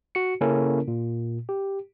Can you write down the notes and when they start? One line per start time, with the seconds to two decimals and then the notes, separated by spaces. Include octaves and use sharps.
0.15 F#4 C#7
0.41 C#3 A#3 C#4 E4 A4 A#4
0.88 A#2
1.49 G4